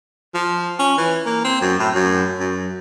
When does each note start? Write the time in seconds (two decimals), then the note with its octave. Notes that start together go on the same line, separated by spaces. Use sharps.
0.34 F3
0.79 C#4
0.98 E3
1.25 A#3
1.44 C4
1.61 F#2
1.79 A2
1.95 F#2
2.40 F#2